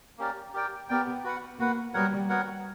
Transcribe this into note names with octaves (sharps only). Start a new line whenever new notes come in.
A#3 C#4 G4 A#4 D5
G4 A#4 D5 G5
B3 G4 A#4 D5 G5
F#4 B4 F#5
A#3 F#4 B4 F#5
G3 B3 F#4 A#4 C#5 F#5
B3 F#4 A#4 C#5 F#5